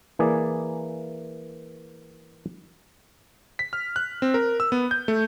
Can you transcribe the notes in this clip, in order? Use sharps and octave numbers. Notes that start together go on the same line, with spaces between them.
E3 A#3 G#4 D5
B6
F6
F#6
C4
A#4
E6
B3
G6
A3